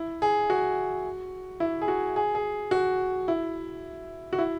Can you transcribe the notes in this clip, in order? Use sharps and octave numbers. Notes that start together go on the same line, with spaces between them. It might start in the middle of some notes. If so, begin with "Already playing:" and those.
Already playing: E4
G#4
F#4
E4
G#4
F#4
G#4
G#4
F#4
E4
F#4
E4